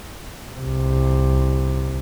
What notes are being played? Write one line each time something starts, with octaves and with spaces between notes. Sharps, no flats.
C2 C3